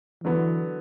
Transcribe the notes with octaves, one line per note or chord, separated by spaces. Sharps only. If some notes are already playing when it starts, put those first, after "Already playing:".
D3 E3 F#3 B3